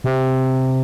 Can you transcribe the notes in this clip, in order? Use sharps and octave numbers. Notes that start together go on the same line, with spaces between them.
C3